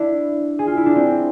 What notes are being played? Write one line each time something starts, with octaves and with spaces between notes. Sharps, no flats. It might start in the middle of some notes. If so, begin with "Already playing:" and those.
Already playing: D4 E4
G#4
F4
E4
D4
C4